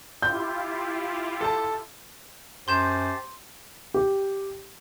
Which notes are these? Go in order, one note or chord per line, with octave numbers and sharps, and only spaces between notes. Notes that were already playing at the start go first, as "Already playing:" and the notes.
E4 F4 G4 G6
A4 A5
F#2 G4 C5 A5 C6 G6 E7
G4